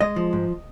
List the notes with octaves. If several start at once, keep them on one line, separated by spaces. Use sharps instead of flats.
G#3 D#5
F3
G#2